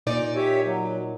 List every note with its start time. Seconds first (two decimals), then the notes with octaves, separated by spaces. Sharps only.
0.07 A#2 D#4 D5
0.36 G4 C#5 E5
0.65 F#3